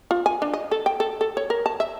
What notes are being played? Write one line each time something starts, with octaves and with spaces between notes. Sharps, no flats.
F4
G#5
D4
D#5
A4
G5
A4
A4
C#5
A#4
A5
E5